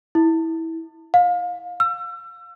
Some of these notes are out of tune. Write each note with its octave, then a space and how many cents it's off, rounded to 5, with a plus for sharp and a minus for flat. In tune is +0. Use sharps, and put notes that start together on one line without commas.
E4 -20
F5 +30
E6 +35